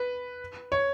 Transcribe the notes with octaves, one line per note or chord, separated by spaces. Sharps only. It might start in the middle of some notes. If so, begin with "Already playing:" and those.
Already playing: B4
C#5